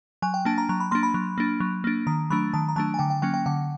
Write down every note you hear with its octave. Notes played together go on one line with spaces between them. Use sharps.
F#3 G#5
G5
A#3 D4 A5
A#5
F#3 A#5
B5
A#3 D4 C6
B5
F#3
A#3 D4
F#3
A#3 D4
D#3 A#5
F#3 A3 D4 B5
D#3 A5
A#5
F#3 A3 D4 A5
G#5
D3 G5
G5
F#3 A#3 C#4 G5
G5
D3 F#5